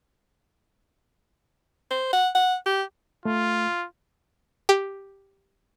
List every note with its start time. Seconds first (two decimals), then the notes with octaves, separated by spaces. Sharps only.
1.91 C5
2.13 F#5
2.35 F#5
2.66 G4
3.25 A3 F4
4.69 G4